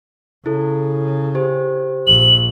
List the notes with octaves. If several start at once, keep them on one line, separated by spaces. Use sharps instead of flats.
C#3 E4 A4
G4 C5
A#1 F#7